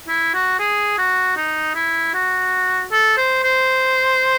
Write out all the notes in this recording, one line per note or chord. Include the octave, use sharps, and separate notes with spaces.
E4
F#4
G#4
F#4
D#4
E4
F#4
A4
C5
C5